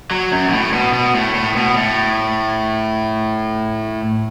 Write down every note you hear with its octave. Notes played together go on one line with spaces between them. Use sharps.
F#3
F#2
B2
A2
B2
B2
A2
A2
B2
A2